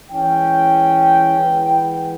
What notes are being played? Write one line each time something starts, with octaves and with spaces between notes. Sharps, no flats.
E3 G#3 C#4 G5
E3 G#3 B3